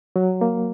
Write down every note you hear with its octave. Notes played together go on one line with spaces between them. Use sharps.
F#3
A#3